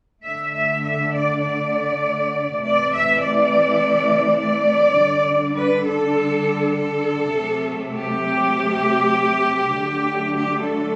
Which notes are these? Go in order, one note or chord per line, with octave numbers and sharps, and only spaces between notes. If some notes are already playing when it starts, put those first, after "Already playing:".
D3 A3 E5
E5
E5
D5
D5
C3 E3 A3 D5
E5
D5
D5
D3 G3
B4
A4
A4
C3 F#3 A3
G4
D3 F#3 A3
G4
A4